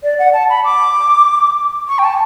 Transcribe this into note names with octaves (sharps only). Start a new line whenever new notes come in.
D5
F#5
A5
B5
D6
C#6
G5
A5